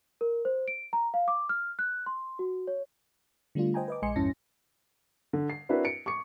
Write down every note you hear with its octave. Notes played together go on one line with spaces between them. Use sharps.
A#4
C5
D7
A#5
F5
D6
F6
F#6
C6
F#4
C#5
D3 G3 A3 D4 F4
C5 D#5 G5 G#5 A#5
B4 D#5 D6
A#1 G#3 D#5 G#5 C6 C#7
F2 G#2 C#4 E4 A5 A#6
D3
C7
C4 D4 E4 F#4 A#4 B4
C#7 D7
C#6 D6 C#7